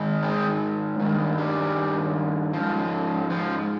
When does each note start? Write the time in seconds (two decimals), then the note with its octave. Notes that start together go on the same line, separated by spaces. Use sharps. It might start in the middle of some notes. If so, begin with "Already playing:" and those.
Already playing: G#2 D#3
0.23 G#3 C4
1.00 G2 D#3
1.38 G3
2.53 G#2 F3
3.30 F3